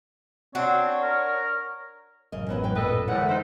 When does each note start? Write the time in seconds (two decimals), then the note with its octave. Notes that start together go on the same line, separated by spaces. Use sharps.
0.55 C4 D4 F#4 C#5
1.03 A#4
2.32 A1 F#2 C#3 A#4 D#5
2.49 F#3 B3 C#4
2.63 G#2 B4 G5
2.75 A#2 A4 B4 D#5
3.07 A2 D3 E3 G#3 F#5 F6 B6
3.29 D4 D#4 C5